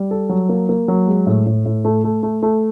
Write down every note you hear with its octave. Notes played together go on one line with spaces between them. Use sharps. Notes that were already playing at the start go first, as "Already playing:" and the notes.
Already playing: G3
A4
F#3
A#3
A#3
F#3
G#3
A2
A2
A2
A3
A3
A3
A3